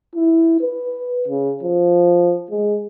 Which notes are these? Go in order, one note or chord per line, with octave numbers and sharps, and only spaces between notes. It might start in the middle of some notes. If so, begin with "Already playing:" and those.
E4
B4
C#3
F3
G#3